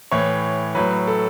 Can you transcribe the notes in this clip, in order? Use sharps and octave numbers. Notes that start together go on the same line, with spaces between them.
A2 E3 C#5
A2 F#3 B4
A4